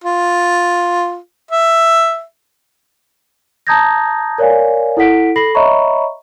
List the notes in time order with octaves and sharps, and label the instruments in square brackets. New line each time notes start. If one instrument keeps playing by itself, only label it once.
[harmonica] F4
E5
[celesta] A5 A#5 D#6 G6 G#6 A#6
A#4 C#5 D5 F5 G#5
E4 A4 F#5 B6 D7
A4 B5 A#6 C7 F#7
C#5 D#5 E5 A#5 B5 C#6